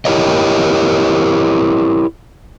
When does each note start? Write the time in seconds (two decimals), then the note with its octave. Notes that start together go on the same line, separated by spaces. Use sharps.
0.05 E4 G4 A#4 C#5 D#5